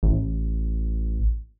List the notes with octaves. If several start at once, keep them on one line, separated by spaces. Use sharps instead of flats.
A1